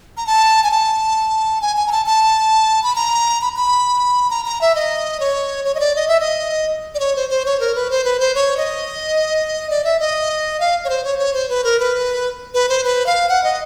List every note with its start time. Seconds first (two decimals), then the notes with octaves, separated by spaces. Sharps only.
0.17 A#5
0.27 A5
0.64 G#5
0.71 A5
1.61 G#5
1.76 G#5
1.87 A#5
1.92 A5
2.06 A5
2.83 B5
2.96 A#5
3.41 B5
3.56 B5
4.30 A#5
4.45 A#5
4.61 E5
4.75 D#5
5.20 C#5
5.65 C#5
5.75 D#5
5.80 D5
5.96 D#5
6.08 E5
6.20 D#5
6.95 D5
7.00 C#5
7.16 C5
7.30 C5
7.46 C#5
7.60 A#4
7.75 B4
7.90 C5
8.04 B4
8.20 C5
8.35 C#5
8.57 D#5
9.70 D5
9.84 E5
10.00 D#5
10.60 F5
10.84 C#5
10.89 C5
11.04 C#5
11.19 C#5
11.34 C5
11.49 B4
11.64 A#4
11.80 B4
12.54 B4
12.69 C5
12.84 B4
13.06 F5
13.29 F#5
13.44 D#5